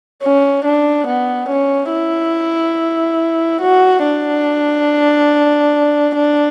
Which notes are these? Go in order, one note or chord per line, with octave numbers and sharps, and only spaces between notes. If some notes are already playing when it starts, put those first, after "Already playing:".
C#4
D4
B3
C#4
E4
F#4
D4
D4